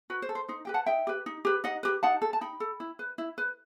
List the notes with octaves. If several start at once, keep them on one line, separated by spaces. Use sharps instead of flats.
F#4 B4
C5
A4
C5
D#4 C5
G4 B4 G5
F#5 A5
D#4 E5 G5
G4 B4
D#4
G4 B4
D#4 D#5 F#5
G4 B4
D#4 F#5 A5
A4
A5
D#4 G5 B5
A4
E4
B4
E4
B4